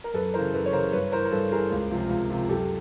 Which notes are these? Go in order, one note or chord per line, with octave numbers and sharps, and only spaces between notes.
A#4
F#2 A4 B4
C#3 E3 A#4 C5
F#2 A4 B4
C#5
C#3 E3 A#4 C5
G2 B4 C#5
E3 A#4 C5
A#4
G2 A4 B4
E3 G#4 A#4
C#2
C3 F3
C#2
C3 F3
F#2 G4 A4